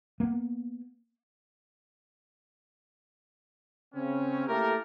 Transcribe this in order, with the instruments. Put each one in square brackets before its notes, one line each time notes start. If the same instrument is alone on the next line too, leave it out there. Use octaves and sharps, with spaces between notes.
[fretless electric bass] A#3 B3
[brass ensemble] C#3 C4 C#4
A3 A#3 E4 G4 A4 A#4